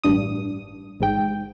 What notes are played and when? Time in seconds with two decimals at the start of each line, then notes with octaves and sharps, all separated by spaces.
0.04 A1 G2 D4 D#6
1.00 A1 G#2 G5